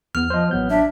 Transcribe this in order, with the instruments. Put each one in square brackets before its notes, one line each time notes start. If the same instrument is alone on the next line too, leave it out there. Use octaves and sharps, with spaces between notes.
[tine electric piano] E2 B3 [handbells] F6
[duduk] F3 [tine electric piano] C5 D#5
[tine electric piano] A1 F#3 G6 [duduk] B3
[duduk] D4 [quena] E5